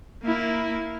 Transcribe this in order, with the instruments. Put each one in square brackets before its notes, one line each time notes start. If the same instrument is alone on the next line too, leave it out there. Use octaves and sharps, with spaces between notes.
[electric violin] A#3 E4